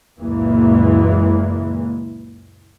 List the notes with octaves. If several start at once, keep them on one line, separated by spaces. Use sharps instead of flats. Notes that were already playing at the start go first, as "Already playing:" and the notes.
F#1 C#2 A#2 E3 G#3 A#3